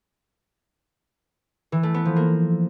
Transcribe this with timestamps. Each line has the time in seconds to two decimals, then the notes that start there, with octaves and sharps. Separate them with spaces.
1.72 E3
1.83 A3
1.94 B3
2.05 F3
2.16 A#3